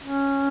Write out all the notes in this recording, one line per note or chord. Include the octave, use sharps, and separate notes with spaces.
C#4